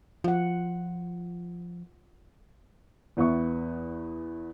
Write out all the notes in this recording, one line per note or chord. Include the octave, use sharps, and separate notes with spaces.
F3 F4 F#5
E2 B3 E5 C#6